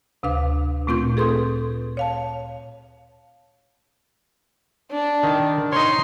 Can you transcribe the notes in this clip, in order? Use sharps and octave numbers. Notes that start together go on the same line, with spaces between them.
D2 C3 D4 B4 F5 D6
A#2 A3 C4 F4 C#6 G6
G#4 A4 B4 C6 D#6 G6
C#5 F5 A5
D4
D#3
D#4 C#5 C6